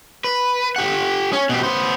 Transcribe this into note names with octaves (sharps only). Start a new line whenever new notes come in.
B4
G4 F#5
C#4
B2 G4
B3 C5